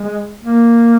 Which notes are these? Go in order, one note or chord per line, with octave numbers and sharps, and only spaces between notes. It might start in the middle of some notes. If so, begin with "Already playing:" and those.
Already playing: G#3
A#3